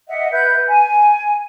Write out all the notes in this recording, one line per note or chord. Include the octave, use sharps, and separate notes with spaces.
D#5 E5 F#5
B4 E5 G6
G#5